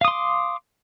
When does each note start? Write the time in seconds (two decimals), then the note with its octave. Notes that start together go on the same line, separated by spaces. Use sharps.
0.01 F5
0.05 D#6
0.08 C6
0.11 D6